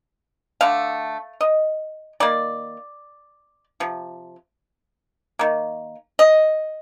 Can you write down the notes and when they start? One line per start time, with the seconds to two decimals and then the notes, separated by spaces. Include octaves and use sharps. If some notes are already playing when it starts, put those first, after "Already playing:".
0.61 D3 A3 F5
1.41 D#5
2.20 D#3 A#3 D5
3.80 C3 F3
5.39 D#3 A#3
6.19 D#5